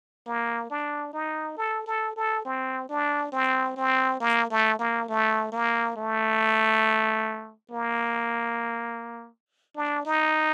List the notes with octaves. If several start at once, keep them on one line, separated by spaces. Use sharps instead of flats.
A#3
D4
D#4
A4
A4
A4
C4
D4
C4
C4
A#3
A3
A#3
A3
A#3
A3
A#3
D4
D#4